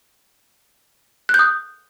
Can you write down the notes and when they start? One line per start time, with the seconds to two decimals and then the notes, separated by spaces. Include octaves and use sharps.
1.29 F#6
1.34 G6
1.39 D#6